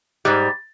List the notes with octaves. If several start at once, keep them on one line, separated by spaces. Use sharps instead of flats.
G#2 G3